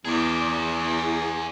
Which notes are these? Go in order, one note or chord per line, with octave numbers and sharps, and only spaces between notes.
E2 G#4 D5